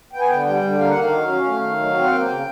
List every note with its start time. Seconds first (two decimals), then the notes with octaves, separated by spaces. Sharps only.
0.13 B3 G5
0.21 G#5
0.28 D3 G5
0.46 G3 G5
0.62 D3
0.79 A#3 F5
0.90 F#5
0.96 D#3 F5
1.12 F#3
1.28 C#4
1.45 A3
1.61 D#3
1.78 F#3
1.94 C4
2.04 F#5
2.11 A#3 G5
2.27 C#3